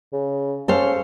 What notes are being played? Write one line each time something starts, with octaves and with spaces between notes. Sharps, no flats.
C#3
C#4 A4 C5 F5